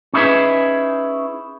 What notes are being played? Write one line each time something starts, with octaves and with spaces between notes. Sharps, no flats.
C#4 D#4 E4 G#4 B4